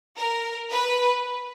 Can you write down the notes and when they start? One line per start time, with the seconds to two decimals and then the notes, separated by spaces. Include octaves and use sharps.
0.17 A#4
0.71 B4